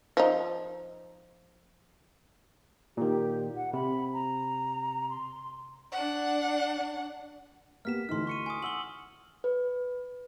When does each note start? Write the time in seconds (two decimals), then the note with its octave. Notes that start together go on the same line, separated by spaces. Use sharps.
0.17 F3 D#4
2.97 A#2 D#3 G4
3.56 F#5
3.73 C3 B5
4.14 A#5
5.10 C6
5.92 D4 F#5
7.85 A#3 B3 G4 F6 B6 E7
8.09 D2 E3 D#4 C6 F6
8.27 C#6 C#7 D#7
8.46 G#5 D#6
8.62 F#5 E6 F#7 G7
9.44 B4